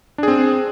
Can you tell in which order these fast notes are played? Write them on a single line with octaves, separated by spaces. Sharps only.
D4 G#4 C4